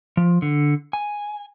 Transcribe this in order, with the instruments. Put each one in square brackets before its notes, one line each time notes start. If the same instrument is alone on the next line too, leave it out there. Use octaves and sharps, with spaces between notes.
[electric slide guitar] F3
D3
G#5